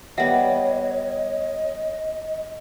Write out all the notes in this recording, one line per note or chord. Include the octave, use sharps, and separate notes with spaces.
G3 B3 C#5 D#5 E5 F#5